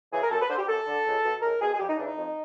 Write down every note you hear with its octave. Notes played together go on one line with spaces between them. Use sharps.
C#3 E3 G#4
A#4
F#2 A4
B4
D3 C5
G4
F#2 A4
D3
C#2
B2
C#2 A#4
B2 G#4
G#4
F2 G4
D#4
C#3 E3 D4
D#4
F2